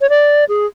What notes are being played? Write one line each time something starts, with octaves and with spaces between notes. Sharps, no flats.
C#5
D5
G#4